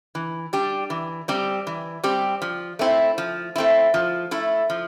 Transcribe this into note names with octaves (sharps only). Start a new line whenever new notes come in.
E3
G3 D4 G4
E3
G3 C4 G4
E3
G3 C4 G4
F3
A3 C4 E4
F3
A3 C4 E4
F3
A3 E4
F3